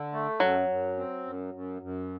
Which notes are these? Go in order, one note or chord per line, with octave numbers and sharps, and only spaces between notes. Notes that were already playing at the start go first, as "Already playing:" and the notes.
Already playing: D3
A3
F#2 F#3
F#2
C4
F#2
F#2
F#2